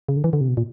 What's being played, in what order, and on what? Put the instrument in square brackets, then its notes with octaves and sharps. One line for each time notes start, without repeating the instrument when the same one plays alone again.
[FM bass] C#3
D3
E3
D3
C3
B2
A#2